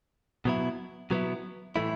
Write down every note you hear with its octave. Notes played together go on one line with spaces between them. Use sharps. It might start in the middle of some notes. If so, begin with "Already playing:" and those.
B2 F#3 B3 E4
B2 F#3 B3 E4
A2 E3 A3 E4